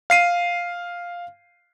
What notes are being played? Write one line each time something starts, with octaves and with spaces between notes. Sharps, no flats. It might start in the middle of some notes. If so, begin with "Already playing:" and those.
F5 C7 D#7